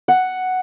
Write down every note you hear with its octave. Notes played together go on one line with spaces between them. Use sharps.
F#5